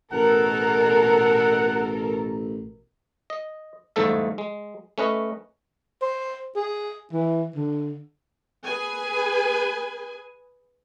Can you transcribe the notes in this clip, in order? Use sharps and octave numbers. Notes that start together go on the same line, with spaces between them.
A1 B2 A4 A#4 F#5
D#5
G1 E2 G#2 A3 A4 E5
G#3
A3 C#4 B4 D#5
C5
G#4
E3
D3
G#4 B4 G#5